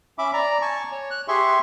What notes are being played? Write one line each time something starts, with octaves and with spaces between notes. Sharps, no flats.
C#4 E5 B5 D6
D5 A#5
G#5 A5 C#6
C#5
F#6
G4 G#4 E5 G#5 C6 C#6